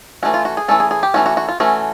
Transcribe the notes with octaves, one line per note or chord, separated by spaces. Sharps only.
E3 A3 C#4 F#4
F4
F#4
G#4
E3 A3 C#4 A4
G#4
G#4
G4
E3 A3 C#4 F#4
F#4
F#4
F4
E3 A3 C#4 F#4